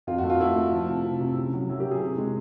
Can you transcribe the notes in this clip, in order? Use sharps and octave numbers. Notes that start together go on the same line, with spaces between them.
F2 F4
F#4
A3
F4
A3 E4
A3
F3
C3
C3
C3
C#3
F#3
F#3 E4
G4
F#3
G#4
C3
G#3